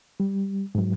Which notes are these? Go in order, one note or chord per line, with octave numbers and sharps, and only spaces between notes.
G3
G#2 F#3